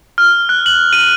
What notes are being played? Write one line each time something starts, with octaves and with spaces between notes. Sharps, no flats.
F6
F#6
F#7
D#7